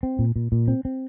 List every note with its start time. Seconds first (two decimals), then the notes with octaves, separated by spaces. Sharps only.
0.03 C4
0.19 A#2
0.36 A#2
0.52 A#2
0.68 C4
0.85 C4